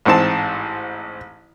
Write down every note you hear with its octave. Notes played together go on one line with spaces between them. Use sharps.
A1 G#2 C4 A5